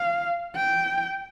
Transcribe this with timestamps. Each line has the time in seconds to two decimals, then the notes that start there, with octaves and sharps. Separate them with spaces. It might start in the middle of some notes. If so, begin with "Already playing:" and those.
Already playing: F5
0.56 G5